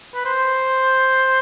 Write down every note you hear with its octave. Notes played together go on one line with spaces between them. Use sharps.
B4
C5